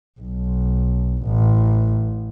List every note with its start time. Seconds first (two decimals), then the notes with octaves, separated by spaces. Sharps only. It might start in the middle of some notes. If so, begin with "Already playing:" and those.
0.20 B1
1.24 A1